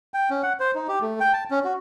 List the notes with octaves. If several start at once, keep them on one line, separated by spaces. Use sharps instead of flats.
G5
C#4
F#5
C5
D#4
G4
A3
G5
A5
C#4
F#4